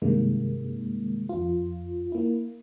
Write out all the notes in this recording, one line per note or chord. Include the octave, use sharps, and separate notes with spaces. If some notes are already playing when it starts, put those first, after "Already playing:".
G2 C3 D#3 G#3 A#3
F2 F4
A#3 E4